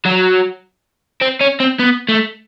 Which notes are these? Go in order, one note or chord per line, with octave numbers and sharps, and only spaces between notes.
F#3
C4
C#4
C4
B3
A3